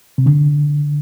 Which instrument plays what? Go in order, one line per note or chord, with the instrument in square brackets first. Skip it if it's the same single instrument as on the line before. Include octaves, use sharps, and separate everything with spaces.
[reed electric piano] C3
D3